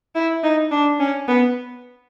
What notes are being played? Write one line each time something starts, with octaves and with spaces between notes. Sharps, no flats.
E4
D#4
D4
C#4
B3